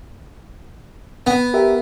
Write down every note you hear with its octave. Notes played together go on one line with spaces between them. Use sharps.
B3 F#5
G4 A#4 E5